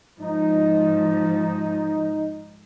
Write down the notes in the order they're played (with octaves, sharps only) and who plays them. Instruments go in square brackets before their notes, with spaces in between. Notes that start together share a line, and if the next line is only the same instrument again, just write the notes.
[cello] G#2 F3 [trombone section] D#4